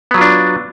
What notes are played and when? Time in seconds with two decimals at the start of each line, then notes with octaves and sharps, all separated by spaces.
0.11 B3
0.14 F#3
0.18 F4
0.21 D4